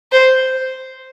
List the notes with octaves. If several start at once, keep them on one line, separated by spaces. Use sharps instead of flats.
C5